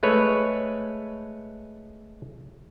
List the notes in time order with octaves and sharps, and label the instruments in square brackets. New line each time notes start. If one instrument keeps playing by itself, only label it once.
[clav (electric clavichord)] G#3 A3 B4 C#5